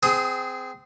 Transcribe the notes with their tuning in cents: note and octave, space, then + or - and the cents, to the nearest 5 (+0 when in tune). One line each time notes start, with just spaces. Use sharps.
C4 -25 G#4 +0 D#6 +20